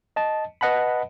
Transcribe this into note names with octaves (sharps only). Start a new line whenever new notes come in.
D#5 A5
B4 D#5 F#5 A5 B5